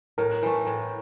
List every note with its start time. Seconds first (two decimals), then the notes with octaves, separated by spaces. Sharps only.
0.18 A2 A#4
0.43 E3 A3
0.67 A2